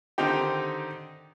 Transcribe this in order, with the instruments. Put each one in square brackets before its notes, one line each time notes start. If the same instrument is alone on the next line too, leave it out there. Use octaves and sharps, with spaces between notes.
[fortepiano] D3 D#3 C4 D#4 G4